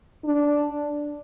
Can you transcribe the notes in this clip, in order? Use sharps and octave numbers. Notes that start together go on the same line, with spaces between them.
D4